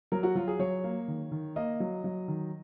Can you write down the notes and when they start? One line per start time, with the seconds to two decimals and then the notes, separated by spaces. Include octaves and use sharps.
0.12 F#3 A#4
0.23 F#4
0.35 F#3 F4
0.48 G#4
0.59 F#3 C#5
0.84 A#3
1.08 D#3
1.31 D#3
1.56 A#3 D#5
1.80 F#3
2.04 F#3
2.28 D#3